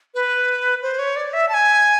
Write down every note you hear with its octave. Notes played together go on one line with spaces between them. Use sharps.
B4
C5
C#5
D5
E5
A5
G#5